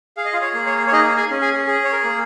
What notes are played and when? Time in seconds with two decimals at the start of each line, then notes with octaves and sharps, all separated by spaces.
0.17 G#4 F5
0.25 D#5
0.33 F4 F5
0.42 C#5
0.54 A#3
0.66 C#5
0.87 C#5
0.92 D#4 G#4 D#5
1.17 G#4 G#5
1.30 C#4
1.42 G#4 G#5
1.67 G#4
1.85 C#5
1.92 A#4
2.04 A#3